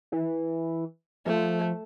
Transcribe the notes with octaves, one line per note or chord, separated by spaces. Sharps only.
E3
F3 A3